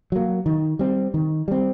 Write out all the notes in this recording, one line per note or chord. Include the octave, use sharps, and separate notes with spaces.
F#3 A#3
D#3
G3 C4
D#3
G3 C4